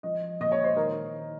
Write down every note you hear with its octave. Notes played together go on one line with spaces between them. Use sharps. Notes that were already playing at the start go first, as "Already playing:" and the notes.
F3 D#5
A#2 D#5
C#5
C5
D#3 A#4
D#3